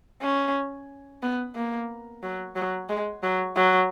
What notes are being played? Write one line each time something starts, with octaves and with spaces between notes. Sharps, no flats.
C#4
B3
A#3
F#3
F#3
G#3
F#3
F#3